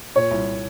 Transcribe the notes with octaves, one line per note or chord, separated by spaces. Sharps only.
A#2 C#5
C2